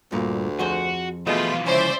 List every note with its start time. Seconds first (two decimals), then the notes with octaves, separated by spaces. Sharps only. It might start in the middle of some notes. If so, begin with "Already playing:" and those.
0.12 D2 G2 A#2
0.59 F2 F#4 G#4 C5
1.27 B2 E3 F3 A3 F4 G#4 D#5 B5
1.66 C#2 C#4 C5 D5 E5